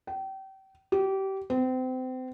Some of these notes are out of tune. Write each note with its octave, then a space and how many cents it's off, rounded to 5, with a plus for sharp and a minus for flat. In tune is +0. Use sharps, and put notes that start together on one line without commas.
G5 -30
G4 -25
C4 -30